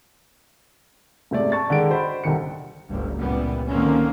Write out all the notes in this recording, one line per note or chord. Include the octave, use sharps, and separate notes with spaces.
G#2 C3 A3 D5
A5 C#6 A6
D3 D#3 G#3 D7
F#4 C5 D#5 B5
C2 D3 D#3 C#7
F#1 C#2 G2
C#2 A#2 E3 G3 B3
D3 D#3 F3 A#3 C4 C#4